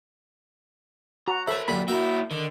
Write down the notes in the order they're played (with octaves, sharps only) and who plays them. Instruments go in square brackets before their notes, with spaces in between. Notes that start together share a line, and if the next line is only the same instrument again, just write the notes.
[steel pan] F#4 [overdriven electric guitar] A#5
[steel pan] A4 E5 [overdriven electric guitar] A#4 B5 [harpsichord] C5 C#5
[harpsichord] F#2 D3 G4 [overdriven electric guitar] A#2 [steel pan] B5
[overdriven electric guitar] A#3 E4 [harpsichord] F#4 E5 G5
[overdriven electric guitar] D3 [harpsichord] D#3